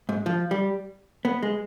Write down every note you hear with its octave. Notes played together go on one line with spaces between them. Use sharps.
G#2
F3
G3
B3
G#3